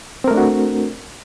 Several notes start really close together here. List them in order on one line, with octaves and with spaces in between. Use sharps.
C4 A#4 A3 D4 F#4